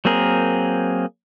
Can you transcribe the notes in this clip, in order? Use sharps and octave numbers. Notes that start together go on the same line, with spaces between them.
F#3 A#3 C4 G#4 A#4